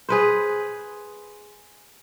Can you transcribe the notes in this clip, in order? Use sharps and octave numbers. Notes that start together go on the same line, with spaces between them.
G#4 B4 C5